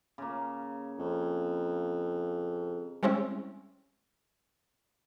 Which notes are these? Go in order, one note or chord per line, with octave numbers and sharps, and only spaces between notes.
C#3 A#3
F2
G3 G#3 C4 C#4 E4